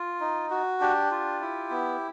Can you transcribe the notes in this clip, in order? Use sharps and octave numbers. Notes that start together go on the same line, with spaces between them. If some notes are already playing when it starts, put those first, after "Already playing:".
Already playing: F4
D#4
F#4
D4 G4
F4
E4
B3